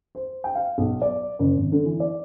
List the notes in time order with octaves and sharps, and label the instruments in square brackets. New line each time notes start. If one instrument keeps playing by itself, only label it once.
[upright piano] C5
G5
F5
B1
D5
F#1
G#1
D3
E3
D5